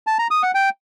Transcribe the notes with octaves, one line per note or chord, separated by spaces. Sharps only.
A5
A#5
D#6
F#5
G5